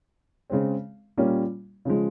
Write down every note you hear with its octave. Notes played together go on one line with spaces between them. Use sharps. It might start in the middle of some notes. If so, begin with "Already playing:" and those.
C#3 G#3 C4
A#2 G3 A#3 C#4
C#3 F3 G#3